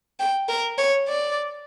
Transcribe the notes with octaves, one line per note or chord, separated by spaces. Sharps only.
G5
A#4
C#5
D5